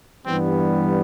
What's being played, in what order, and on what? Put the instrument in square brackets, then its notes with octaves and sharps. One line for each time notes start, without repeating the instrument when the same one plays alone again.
[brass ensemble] G2 E3 G3 B3 C4